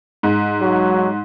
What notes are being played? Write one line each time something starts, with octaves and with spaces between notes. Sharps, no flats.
G#2
F#3